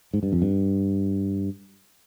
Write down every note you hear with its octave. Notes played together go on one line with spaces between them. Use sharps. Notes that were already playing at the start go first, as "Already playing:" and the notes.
G#2
G2
F2
G2